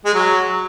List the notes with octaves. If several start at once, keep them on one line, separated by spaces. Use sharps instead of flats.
G#3
F#3